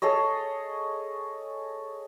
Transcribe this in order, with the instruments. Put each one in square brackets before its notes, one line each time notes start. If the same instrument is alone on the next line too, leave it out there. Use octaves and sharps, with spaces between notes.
[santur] G#4 A4 C#5 D#5